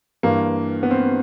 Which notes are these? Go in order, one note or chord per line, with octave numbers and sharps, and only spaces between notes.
G2 E3 A#3
B3
C4